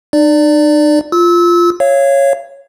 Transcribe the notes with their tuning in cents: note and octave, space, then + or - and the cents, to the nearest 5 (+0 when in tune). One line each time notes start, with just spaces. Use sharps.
D#4 -45 D5 +0
F4 -5 E6 -25
C#5 -5 F5 -30